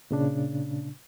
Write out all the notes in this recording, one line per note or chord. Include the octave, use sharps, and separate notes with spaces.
A#2 C#3 D4